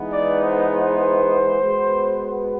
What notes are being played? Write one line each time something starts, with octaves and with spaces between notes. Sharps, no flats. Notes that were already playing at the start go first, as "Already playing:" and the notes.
Already playing: E3 G#3 B3 D#4
D5
C5
C5
B2 G#3 B3